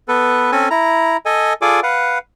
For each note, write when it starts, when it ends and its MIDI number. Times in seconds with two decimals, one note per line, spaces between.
0.08 0.51 59
0.08 0.51 69
0.08 0.51 71
0.52 0.69 60
0.52 0.69 61
0.52 0.69 69
0.52 0.69 80
0.71 1.17 64
0.71 1.17 82
1.26 1.53 69
1.26 1.53 75
1.26 1.53 80
1.62 1.80 65
1.62 1.80 68
1.62 1.80 69
1.62 1.80 74
1.62 1.80 80
1.62 1.80 86
1.83 2.18 71
1.83 2.18 77
1.83 2.18 78